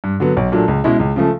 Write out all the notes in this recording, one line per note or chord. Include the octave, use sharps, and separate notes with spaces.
G2
D3 F#3 B3
B1
A#2 F#3 A3 D4
C#2
B2 G#3 C#4 E4
C#2
C#3 F3 A3